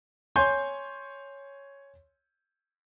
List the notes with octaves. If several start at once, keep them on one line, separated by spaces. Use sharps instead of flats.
C#5 G#5 C6 G6